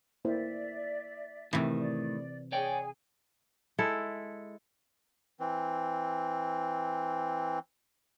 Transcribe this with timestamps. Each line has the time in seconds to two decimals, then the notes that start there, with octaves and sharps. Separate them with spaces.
0.25 A#3 E4 C5 D5 E5
1.53 A2 C3 D#3 E3
1.79 D5
2.52 G#4 C#5 D5 G5 G#5
3.78 G#3 E4 A4
5.40 E3 C4